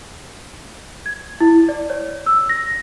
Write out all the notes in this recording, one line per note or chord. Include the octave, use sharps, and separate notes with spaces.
G#6
E4
D5
C#5
E6
A#6